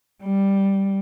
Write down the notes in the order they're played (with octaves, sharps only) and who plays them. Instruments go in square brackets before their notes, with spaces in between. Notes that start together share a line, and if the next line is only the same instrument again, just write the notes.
[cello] G3